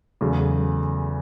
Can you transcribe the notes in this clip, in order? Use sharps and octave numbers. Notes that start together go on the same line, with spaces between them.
E2 C#3 F#3 A3